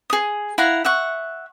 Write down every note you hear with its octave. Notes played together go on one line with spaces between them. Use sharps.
G#4 D#6
E4 F5 F#5 A#5
E5 F#5 C#6